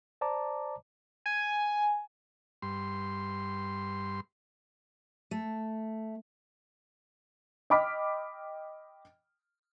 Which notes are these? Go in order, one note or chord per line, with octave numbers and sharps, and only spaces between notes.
C5 D5 A5 A#5 D6
G#5
G2 C6
A3
D#5 G5 B5 D6 F6 B6